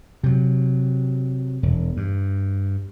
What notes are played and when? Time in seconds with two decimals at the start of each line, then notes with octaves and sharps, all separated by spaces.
0.24 C3 F#3
1.63 E1
1.97 G2